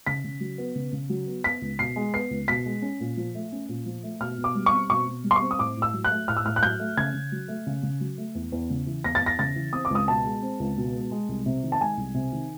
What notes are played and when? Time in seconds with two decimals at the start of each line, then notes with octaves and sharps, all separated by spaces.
0.07 C#3 B6
0.24 C#3
0.40 F#3
0.58 B3
0.75 C#3
0.93 C#3
1.09 F#3
1.27 B3
1.44 B3 B6
1.61 C#2
1.79 B2 C7
1.96 G#3
2.14 B3 C7
2.31 C#2
2.48 B2 B6
2.66 G#3
2.82 C#4
3.00 A#2
3.17 F3
3.35 A3
3.52 C#4
3.69 A#2
3.86 F3
4.03 A3
4.21 B2 F6
4.38 B2
4.44 D6
4.55 G3
4.66 C#6
4.73 C4
4.90 B2 C#6
5.07 B2
5.24 G3
5.31 C6
5.36 C#6
5.42 C4
5.51 D#6
5.58 A2 D6
5.77 A2
5.82 E6
5.94 F#3
6.04 F#6
6.11 A3
6.28 A2 F6
6.37 E6
6.45 A2 F6
6.56 F#6
6.62 F#3 G6
6.80 A3
6.97 C#3 G#6
7.14 C#3
7.32 F#3
7.48 A3
7.67 C#3
7.83 C#3
8.00 F#3
8.18 A3
8.35 E2
8.52 E2
8.70 C#3
8.86 E3
9.04 E2 A#6
9.15 A6
9.21 E2
9.26 A#6
9.39 C#3 A6
9.55 E3
9.73 C4 D#6
9.85 D6
9.90 C#2 D#6
10.07 B2 A5
10.25 G#3
10.42 C4
10.60 C#2
10.77 B2
10.94 G#3
11.11 G#3
11.29 C2
11.46 C3
11.63 D#3
11.72 A5
11.80 G#3 G#5
11.97 C2
12.14 C3
12.33 D#3